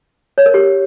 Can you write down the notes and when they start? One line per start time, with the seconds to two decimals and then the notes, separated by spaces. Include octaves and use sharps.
0.38 C#5
0.46 A#4
0.54 G4